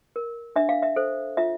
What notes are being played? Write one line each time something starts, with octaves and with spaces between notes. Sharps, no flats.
A#4
D4 E5
F5
E5
A4 C5
F4 E5